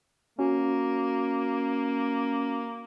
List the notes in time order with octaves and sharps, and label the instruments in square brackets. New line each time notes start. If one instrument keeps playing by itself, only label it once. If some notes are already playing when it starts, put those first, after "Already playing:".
[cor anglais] A#3 [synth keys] C#4 F#4